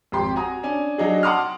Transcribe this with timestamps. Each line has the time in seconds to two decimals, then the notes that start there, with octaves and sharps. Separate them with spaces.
0.12 G#1 F2 G4 C6
0.35 F#4 G#5 A#5 D#6
0.63 C#4 D4 G#5
0.98 F#3 D4 D#4 F#4 G#4
1.23 F#5 A5 C6 D6 D#6 F6